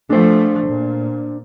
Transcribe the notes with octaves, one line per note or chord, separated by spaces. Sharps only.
F3 A3 D4 C5
A#2